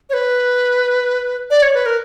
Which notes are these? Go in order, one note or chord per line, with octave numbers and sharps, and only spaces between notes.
C#5
B4
D5
C#5
B4
A#4